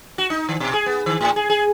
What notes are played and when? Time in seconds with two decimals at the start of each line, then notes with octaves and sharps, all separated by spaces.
0.18 F#4
0.30 D#4
0.49 D#3
0.60 B2
0.74 G#4
0.86 B3
1.06 D#3
1.21 A2
1.36 G#4
1.50 G#4